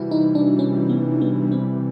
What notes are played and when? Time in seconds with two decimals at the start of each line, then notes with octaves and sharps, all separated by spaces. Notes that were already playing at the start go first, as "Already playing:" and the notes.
Already playing: C3 E3 G3 E4 F#4
0.11 D#4
0.35 D4
0.59 C#4
0.89 B3
1.22 B3
1.52 C4